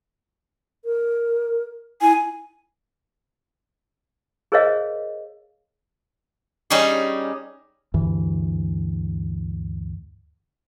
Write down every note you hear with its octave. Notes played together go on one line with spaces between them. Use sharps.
A#4
E4 G#5
G#4 A#4 C5 C#5 D#5 F5
G3 C#4 D#4 G4 G#4
D2 G2 E3